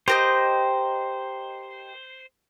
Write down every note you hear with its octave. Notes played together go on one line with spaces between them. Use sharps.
G4 A#4 C5 D#5